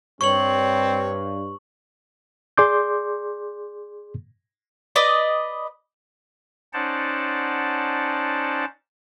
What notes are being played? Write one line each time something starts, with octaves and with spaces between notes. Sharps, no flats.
G2 C4 C#5 C#6 F#7
G#4 D5 C6 D6 G6
B4 D5 D#5
C#4 D#4 C5 D5 F#5 A5